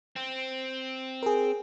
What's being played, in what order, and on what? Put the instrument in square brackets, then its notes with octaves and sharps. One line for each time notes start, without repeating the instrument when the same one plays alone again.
[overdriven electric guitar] C4
[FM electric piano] G#4 A#4